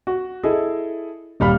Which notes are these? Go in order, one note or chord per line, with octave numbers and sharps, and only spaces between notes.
F#4
E4 G#4 A4 D#5
D#1 G3 F5 B5 F6